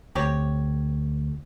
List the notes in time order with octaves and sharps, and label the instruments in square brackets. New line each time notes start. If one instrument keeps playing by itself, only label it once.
[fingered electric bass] D2 [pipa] C4 G4 C#5